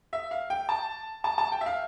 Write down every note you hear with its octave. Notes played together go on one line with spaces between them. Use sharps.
E5
F5
G5
A5
A5
A5
G5
E5
F5